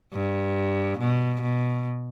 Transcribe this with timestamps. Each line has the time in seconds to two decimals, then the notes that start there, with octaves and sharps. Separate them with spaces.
0.13 G2
0.99 B2
1.41 B2